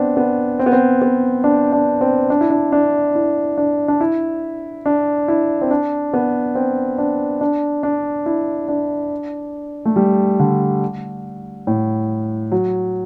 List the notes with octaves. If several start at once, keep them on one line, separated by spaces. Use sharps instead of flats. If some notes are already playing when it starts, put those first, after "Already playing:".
Already playing: B3 C4 D4
B3
C4
B3
C4
B3
D4
D4
C4
D4
E4
D4
D4
E4
D4
D4
E4
D4
E4
C4
D4
B3
C4
D4
D4
D4
E4
D4
A3
G3
D3
A2
F#3